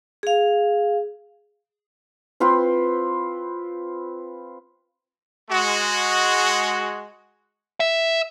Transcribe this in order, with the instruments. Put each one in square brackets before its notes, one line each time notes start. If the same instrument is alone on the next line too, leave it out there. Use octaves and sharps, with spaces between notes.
[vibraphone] G#4 F5
[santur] C4 F4 B4 C5
[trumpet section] G#3 F#4
[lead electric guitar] E5